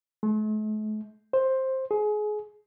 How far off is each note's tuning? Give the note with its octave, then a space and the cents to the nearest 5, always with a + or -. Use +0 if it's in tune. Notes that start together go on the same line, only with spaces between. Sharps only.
A3 -45
C5 +10
G#4 +25